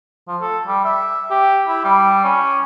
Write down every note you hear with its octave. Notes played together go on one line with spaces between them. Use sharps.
F3
A4
G3
E5
G4
E4
G3
C#4